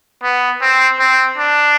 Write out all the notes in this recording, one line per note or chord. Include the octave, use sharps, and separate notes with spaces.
B3
C4
C4
D4